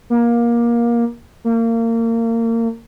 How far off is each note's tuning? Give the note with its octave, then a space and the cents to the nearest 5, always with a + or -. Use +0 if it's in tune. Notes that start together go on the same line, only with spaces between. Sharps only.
A#3 +20
A#3 -30